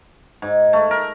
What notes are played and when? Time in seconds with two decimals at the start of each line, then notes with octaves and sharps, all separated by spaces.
0.42 G#2
0.73 A3
0.91 A#4